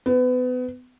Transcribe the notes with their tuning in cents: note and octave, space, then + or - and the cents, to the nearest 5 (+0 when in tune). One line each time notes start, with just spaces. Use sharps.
B3 +30